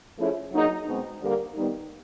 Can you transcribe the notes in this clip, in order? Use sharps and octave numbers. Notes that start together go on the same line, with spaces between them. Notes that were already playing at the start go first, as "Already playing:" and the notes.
F3 A3 C#4 E4 G#4
F#3 A#3 D#4 G#4
B2 G#3 C4
D3 G3 A#3
D#3 G3 B3 D#4